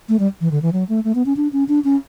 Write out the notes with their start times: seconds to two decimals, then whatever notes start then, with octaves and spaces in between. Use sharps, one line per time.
0.09 A3
0.19 G3
0.41 E3
0.51 D3
0.62 E3
0.73 F#3
0.89 A3
1.05 A3
1.15 B3
1.26 C#4
1.37 D4
1.53 C#4
1.68 D4
1.84 C#4